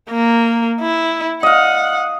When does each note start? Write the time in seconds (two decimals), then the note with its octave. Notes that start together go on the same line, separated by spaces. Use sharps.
0.10 A#3
0.80 E4
1.43 D#5 F5 F#5